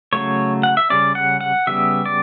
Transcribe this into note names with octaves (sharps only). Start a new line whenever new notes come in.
C#3 F#3 A3 C#5
F#5
E5
C#3 G3 C#4 D5
F#5
F#5
C#3 G3 B3 E5
D5